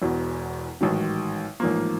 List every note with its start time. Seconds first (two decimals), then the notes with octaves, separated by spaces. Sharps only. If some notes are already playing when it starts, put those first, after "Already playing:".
0.02 E1 E2 B2
0.81 A1 G#2 D#3 F#3
1.60 A1 G#2 F3 A#3